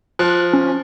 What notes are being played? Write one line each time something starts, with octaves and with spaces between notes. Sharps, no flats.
F3 F#6
C#4